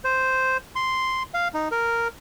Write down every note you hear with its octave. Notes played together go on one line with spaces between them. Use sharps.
C5
C6
F5
D#4
A#4